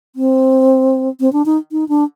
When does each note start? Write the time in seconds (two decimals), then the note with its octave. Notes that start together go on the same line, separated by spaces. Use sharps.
0.16 C4
1.20 C4
1.33 D4
1.46 D#4
1.72 D#4
1.89 D4